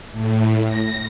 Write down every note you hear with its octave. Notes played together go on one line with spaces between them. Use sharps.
A2
A#6